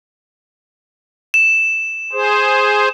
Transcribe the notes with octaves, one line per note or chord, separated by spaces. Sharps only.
E7
G#4 C5